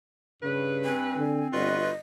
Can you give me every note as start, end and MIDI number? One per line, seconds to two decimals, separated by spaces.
0.43 1.22 43
0.43 0.91 49
0.43 1.22 71
0.84 1.78 60
0.84 1.48 80
1.17 1.46 50
1.53 1.92 31
1.53 1.91 65
1.53 1.91 66
1.53 1.91 71
1.53 1.97 75